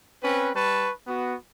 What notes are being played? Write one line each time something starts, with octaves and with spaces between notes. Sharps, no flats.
C4 C#4 B4
G3 B4 A5 C#6
B3 F#4